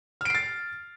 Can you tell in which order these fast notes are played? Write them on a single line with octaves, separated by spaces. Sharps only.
F6 D7 C7 A6